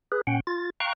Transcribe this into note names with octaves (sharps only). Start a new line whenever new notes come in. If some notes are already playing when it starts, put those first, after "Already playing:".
G#4 B4
A#2 C#4 F#5 G5
F4 A6
F5 G5 A#5 C#6 F#6